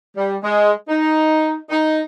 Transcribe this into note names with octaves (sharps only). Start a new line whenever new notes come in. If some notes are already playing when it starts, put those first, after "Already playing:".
G3
G#3
D#4
D#4